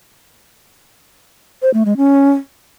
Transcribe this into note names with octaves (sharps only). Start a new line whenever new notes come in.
C5
A3
G#3
C#4